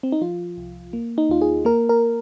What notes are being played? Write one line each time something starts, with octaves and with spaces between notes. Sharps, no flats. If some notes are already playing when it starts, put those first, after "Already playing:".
C4
D#4
F3 F4
C2
A#3
D#4
D#2 F4
G#4
A#3 A#4
A#4